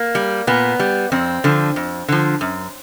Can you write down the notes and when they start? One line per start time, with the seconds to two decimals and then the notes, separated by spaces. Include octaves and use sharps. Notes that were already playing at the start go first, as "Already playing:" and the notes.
Already playing: A#3
0.15 G3
0.47 A#2 B3
0.80 G3
1.12 F2 C4
1.44 D3 F3
1.76 F2
2.08 D3 F3
2.41 F#2